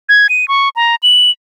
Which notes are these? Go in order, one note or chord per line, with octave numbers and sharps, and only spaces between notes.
G#6
D#7
C#6
A#5
F#7